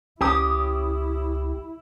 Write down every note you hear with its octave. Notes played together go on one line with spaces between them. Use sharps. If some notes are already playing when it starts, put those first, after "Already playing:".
C#2 C#4 E4 G4 D#6